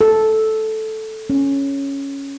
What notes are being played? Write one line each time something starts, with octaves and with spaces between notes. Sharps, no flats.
A4
C#4